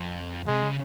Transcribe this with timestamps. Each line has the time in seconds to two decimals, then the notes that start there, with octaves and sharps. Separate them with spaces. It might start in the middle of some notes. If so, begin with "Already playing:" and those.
Already playing: F2
0.47 C3 G#3
0.62 C#3